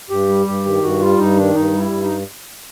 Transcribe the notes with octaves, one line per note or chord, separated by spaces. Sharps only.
G2 G4
G3
G2 G4
D#3
G2 F#4
G3 F4
G2 D#4
D#3 D4
G2 D#4
G3
E4
G2
D#4